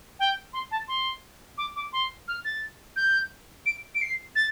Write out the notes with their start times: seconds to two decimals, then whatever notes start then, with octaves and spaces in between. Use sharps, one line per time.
0.19 G5
0.53 C6
0.71 A5
0.88 C6
1.58 D6
1.76 D6
1.93 C6
2.28 F6
2.45 A6
2.96 G6
3.66 D7
3.95 D7
4.01 C7
4.36 A6